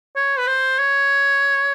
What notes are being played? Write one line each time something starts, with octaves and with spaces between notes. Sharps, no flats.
C#5
B4
C5
C#5